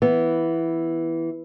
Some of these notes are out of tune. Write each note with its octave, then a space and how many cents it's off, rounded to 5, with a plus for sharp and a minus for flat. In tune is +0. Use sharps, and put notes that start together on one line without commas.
E3 +0 B3 +0